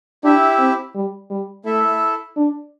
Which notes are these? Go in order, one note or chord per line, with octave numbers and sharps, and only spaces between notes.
D4 E4 G4 E5
C4
G3
G3
A3 E4 A4 E5
D4